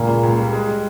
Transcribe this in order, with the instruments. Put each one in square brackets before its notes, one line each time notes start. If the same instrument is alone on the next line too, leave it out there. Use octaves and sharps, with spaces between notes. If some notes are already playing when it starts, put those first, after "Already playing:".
Already playing: [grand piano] C#2 [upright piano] A#2 A#3
[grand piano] C#3
C#2
G3
G#3
G#3